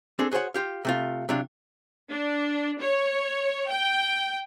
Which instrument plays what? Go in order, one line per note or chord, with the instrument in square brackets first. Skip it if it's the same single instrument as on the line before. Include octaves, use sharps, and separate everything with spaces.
[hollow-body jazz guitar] C4 D4 G#4 A4
F#4 G#4 C5 C#5 F#5
F4 G4 F5
C3 A3 F4
C3 F#3 D4 F4
[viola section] D4
C#5
G5